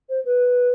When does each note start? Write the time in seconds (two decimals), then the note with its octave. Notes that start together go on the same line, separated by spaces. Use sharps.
0.09 C5
0.25 B4